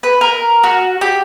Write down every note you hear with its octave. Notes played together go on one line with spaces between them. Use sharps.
B4
A#4
F#4
G4